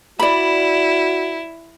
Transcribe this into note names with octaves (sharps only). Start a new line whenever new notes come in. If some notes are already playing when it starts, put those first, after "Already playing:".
E4 F#4 D5 B5